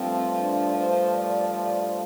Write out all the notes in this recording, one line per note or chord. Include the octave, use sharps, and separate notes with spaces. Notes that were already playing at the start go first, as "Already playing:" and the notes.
Already playing: G2 F3 A3 C4
D4
C5
D5
D5